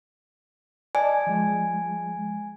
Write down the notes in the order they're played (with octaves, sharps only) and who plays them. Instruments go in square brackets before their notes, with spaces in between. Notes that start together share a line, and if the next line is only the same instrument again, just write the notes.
[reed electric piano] D5 D#5 A5 [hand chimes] G#5
[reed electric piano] F3 G#3